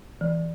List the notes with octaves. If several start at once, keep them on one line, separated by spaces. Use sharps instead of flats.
E3